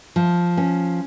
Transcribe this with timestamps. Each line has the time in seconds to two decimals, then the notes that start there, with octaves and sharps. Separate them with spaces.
0.16 F3
0.57 C#4